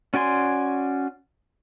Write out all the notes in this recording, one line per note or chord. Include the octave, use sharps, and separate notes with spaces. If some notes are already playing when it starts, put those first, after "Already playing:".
C#4 F#4 D5 G#5 C6